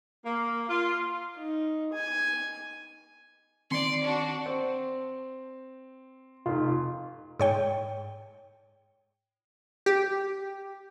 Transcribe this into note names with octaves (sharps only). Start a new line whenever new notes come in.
A#3
F4
D#4
G#5
D#3 C4 D5 C6 C#7
D4 F#4
C4
F1 D#4 F4
G#2 C#5 G5
G4